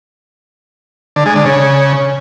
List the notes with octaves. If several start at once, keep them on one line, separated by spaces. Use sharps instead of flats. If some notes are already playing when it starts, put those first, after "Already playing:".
D3
G#3
D3
C#3